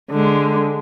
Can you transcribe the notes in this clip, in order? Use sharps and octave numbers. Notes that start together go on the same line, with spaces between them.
D3 G#3